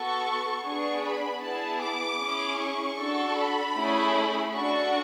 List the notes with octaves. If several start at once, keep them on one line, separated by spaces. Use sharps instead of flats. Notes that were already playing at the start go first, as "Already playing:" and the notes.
Already playing: B3 F#4 A4 C#6
B3 D4 G#4 C#6
B5
B3 E4 G#4 A5
D6
C#4 E4 G#4
C#6
D4 F#4 A4
B5
A3 C#4 E4 G#4
D4 F#4 A4 C#6